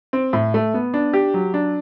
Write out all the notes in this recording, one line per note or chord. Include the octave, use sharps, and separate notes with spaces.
C4
A2
A3
B3
D4
G4
F#3
D4